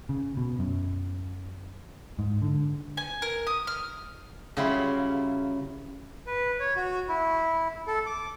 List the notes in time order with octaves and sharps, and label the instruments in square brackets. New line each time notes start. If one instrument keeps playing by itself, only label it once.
[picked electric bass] C#3
B2
F#2
G#2
D3
[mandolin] G#5
A#4
D#6
F6
[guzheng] C#3 F#3 G3 E4 F4
[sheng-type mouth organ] B4
C#5
F#4
E4
A4
D6